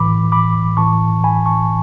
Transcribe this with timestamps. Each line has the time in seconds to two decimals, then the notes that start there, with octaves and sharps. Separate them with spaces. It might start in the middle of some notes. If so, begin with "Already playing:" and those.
Already playing: A2 E3 B5 D6
0.32 B5 D6
0.77 A2 E3 A5 C#6
1.24 G#5 B5
1.46 A5 C#6